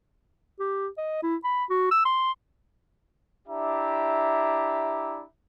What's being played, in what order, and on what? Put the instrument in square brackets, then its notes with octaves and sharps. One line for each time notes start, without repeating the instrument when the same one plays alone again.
[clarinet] G4
D#5
E4
B5
F#4
E6
C6
[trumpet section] D4 E4 G4 E5 A#5